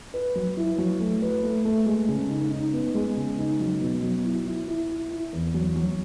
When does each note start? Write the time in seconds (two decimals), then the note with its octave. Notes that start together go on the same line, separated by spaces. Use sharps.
0.14 B4
0.35 F#3
0.57 E4
0.78 F#3
1.00 A3
1.22 B4
1.43 A3
1.65 A3
1.86 G#3
2.08 C#3
2.30 D#4
2.51 D#4
2.73 B3
2.95 G#3
3.17 C#3
3.38 D#4
3.60 F#3
3.81 B2
4.03 F#3
4.24 E4
4.46 E4
4.68 E4
4.89 E4
5.11 E4
5.33 E2
5.54 F#3
5.76 F#3